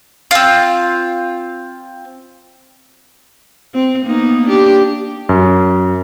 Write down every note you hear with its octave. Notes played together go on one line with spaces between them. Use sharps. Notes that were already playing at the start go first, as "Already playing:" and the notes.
C4 F4
C4
A#3 B3 D#4
D4 G4
F#2